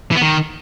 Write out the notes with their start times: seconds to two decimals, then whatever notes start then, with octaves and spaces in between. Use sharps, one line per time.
0.11 E3
0.16 B3
0.22 D#3